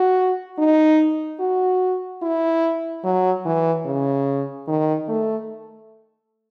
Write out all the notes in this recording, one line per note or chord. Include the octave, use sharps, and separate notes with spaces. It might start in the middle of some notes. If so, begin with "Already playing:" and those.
Already playing: F#4
D#4
F#4
E4
F#3
E3
C#3
D#3
A3